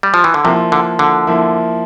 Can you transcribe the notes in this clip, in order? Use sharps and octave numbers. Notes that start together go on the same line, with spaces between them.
G3
F3
E3
D3
C3 F3 A#3 E4
D3
D3
F3 A#3 E4